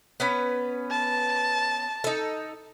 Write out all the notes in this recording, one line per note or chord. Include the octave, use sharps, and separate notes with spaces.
B3 C#4 B4
A5
D#4 A4